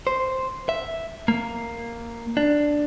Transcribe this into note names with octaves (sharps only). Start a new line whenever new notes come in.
C5
E5
A#3
D4